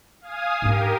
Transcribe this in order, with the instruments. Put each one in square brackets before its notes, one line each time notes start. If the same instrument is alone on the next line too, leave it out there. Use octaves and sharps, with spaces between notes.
[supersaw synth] F5 G#5 D#6
[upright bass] G#2 D4 [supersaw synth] G4 A#4